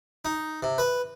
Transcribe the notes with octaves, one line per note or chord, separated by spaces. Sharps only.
D#4
C3
B4